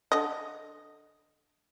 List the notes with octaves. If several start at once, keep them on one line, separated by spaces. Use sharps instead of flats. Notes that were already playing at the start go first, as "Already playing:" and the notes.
D3 D#5